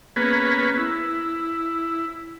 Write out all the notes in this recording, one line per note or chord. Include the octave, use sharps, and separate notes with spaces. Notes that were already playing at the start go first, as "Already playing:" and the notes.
A#3 B3 C#4 G#4 B4
E4